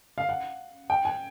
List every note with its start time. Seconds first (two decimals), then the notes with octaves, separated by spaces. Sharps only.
0.18 F5
0.29 F#5
0.90 G5
1.05 G#5